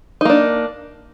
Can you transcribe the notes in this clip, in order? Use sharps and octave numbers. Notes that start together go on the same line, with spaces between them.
A#3 D4 D#4